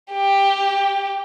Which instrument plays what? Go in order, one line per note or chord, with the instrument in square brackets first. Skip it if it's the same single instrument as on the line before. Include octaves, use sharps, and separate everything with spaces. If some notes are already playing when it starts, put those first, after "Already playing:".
[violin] G4